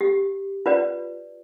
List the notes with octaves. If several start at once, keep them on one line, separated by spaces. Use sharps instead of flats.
G4
F4 B4 D5